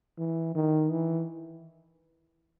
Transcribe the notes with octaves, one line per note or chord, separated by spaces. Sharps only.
E3
D#3
E3